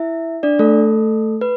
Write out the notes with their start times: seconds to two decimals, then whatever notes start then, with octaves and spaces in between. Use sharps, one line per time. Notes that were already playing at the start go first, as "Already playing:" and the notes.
Already playing: E4 E5
0.43 D4 D5
0.59 A3 A4
1.41 B4